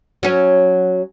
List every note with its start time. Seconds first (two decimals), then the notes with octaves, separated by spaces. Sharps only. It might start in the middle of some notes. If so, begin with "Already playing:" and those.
0.23 F#3 C#4